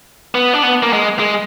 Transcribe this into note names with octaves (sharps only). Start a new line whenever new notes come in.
B3
D4
B3
A#3
G#3
G#3